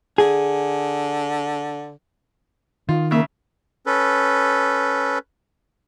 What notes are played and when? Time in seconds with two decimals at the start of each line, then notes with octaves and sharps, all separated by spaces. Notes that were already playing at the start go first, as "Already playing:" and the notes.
0.18 D3 G#4
2.89 D#3 F4
3.11 C#3 A#3 E5
3.86 C#4 A4 B4